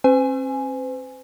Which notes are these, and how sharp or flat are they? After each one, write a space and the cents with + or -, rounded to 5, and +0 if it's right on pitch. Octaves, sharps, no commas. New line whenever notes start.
C4 +45 C5 -45 G#5 +0